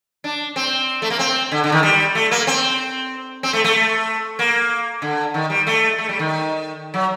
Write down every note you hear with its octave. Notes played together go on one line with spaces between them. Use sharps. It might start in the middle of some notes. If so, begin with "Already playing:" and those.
D4
C4
A3
A#3
C4
D3
D3
D#3
G3
A3
A#3
C4
C4
A3
A3
A#3
D3
D#3
G3
A3
A3
G3
D#3
F#3